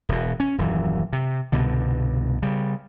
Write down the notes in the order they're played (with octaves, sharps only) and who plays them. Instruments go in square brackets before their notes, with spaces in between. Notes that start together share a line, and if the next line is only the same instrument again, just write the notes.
[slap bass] E1 B2
C#4
D#1 F#2 E3
C3
C2 G2 B2 D3
C#3 G3